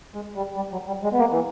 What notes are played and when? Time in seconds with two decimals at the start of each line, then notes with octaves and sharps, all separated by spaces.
0.14 G#3
0.36 G3
0.56 G3
0.72 F#3
0.87 G3
1.04 G#3
1.13 B3
1.19 A#3
1.32 E3